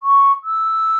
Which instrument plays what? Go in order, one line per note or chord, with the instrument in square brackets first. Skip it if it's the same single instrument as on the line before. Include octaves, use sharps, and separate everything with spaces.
[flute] C#6
E6